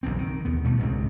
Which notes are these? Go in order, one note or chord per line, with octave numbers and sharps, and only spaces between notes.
F#1 B1 E3 C4
D#3
D#2 B3
D2 B2 G3 A3
C2 G#2 C#3 C4